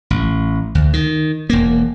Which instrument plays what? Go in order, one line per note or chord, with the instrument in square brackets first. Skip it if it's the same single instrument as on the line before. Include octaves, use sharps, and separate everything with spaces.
[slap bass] A1
D2
D#3
E1 A#3